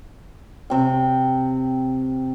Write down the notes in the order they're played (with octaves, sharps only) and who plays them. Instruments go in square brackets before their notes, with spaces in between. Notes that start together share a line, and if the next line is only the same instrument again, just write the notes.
[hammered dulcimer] C3 G5